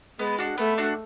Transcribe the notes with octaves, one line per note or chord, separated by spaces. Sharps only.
G#3 B3
D4 F#4
A3 B3
D4 F#4